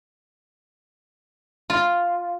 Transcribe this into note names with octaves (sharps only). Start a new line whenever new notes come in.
F4